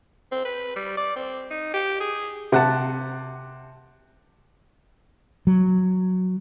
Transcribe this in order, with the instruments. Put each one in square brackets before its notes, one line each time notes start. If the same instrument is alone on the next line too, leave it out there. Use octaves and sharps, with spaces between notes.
[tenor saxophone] C4
B4
G3
D5
C4
D#4
G4
G#4
[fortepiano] C3 F#5 A5
[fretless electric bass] F#3